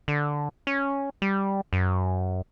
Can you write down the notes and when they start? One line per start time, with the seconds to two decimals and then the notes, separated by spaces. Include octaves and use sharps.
0.08 D3
0.67 C#4
1.22 G3
1.73 F#2